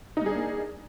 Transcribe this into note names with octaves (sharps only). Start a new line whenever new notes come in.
G3 A#3 D4 D#4 G#4